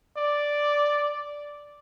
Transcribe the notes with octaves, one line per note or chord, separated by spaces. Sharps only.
D5